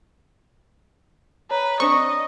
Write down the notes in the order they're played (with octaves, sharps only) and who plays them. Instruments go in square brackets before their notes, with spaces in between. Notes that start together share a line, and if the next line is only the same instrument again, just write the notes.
[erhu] B4 [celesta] C#5 A#5
[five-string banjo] C4 D4 [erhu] D#5 [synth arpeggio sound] C#6